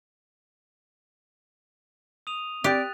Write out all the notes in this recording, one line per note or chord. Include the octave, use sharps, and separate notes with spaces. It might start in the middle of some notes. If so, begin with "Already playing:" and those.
D#6 D#7 F7
C4 G4 D5 F#6 A6